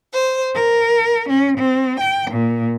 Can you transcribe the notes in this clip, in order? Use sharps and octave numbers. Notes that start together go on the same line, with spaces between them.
C5
A#4
C#4
C4
G5
A#2